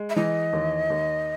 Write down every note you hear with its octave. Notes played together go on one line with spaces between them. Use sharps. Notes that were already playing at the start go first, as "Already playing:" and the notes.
Already playing: G#3
E5
E3 D#5
D#2
D#2